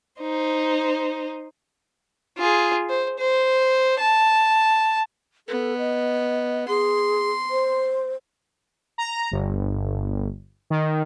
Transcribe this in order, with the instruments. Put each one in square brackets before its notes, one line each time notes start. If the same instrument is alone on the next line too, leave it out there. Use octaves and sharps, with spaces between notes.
[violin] D#4 C5
[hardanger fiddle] F4 G#4
C5
C5
A5
[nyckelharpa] B3 [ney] A4
[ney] D#5
[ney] G#4 [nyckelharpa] C6
[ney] C5
[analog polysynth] A#5
G1
D#3